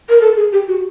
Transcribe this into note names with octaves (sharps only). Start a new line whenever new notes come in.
A#4
A4
G#4
G4
F#4